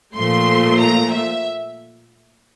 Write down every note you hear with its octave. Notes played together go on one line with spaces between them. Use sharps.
A#2 F3 A3 C6
A#5
E5